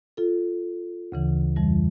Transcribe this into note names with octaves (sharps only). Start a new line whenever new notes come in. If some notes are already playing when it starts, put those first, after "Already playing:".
F4 A4
D2 C#3 E3
F2 E3 G3